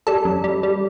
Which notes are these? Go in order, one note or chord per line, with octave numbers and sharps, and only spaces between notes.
G3 A4
F#2
G3
G3